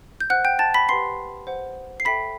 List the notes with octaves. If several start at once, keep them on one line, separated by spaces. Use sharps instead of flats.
G6
C5 F#5 F#6
G5 G6
A5 A6
B5 B6
G4 B4 F#5 C6 C7
C5 F#5
C7
A4 E5 G5 B5 B6